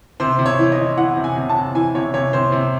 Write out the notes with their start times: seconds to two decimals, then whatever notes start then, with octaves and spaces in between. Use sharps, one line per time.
0.20 C3 C5
0.39 C3
0.46 C#5
0.59 E3
0.72 D#5
0.79 E3
0.97 E3 F#5
1.17 C3
1.24 G#5
1.36 C3
1.49 A5
1.56 C3
1.75 E3 G#5
1.95 C3 C#5
2.14 C3 C#5
2.33 C3 C5
2.52 C3